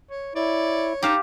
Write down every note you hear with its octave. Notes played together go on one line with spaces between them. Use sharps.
C#5
E4 C#5 D5
D#4 G4 F5 A5